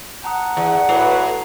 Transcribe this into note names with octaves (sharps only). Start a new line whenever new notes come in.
F#5 A5 A#5 D#6
E2
A2 F#4 B4 C7 F7